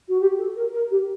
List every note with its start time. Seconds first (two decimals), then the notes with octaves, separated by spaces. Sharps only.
0.09 F#4
0.21 G4
0.38 A4
0.56 A#4
0.73 A#4
0.91 G4